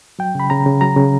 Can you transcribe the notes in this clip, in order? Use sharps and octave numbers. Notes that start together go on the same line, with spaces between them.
F#3 G5
C#3 B5
C#3 A#5
C#3
F#3 A#5
C#3